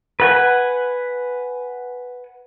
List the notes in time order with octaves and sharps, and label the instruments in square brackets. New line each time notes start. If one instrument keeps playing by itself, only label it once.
[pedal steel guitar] B4 F#5 G#5